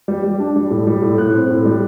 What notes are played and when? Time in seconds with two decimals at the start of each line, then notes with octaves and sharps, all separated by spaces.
0.08 G3
0.24 G3
0.40 D4
0.56 G3
0.71 A2
0.87 G3
1.02 A2
1.18 A2 F#6
1.34 C4
1.50 A2
1.65 G3